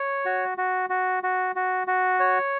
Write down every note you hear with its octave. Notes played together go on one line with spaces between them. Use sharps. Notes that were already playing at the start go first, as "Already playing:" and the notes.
Already playing: C#5
F#4
F#4
F#4
F#4
F#4
F#4
C#5